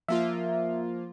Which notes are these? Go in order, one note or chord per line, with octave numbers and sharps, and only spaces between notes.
F3 A#3 F4 E5